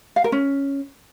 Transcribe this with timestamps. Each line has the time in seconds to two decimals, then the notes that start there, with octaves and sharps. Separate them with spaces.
0.16 F5
0.24 A#4
0.32 C#4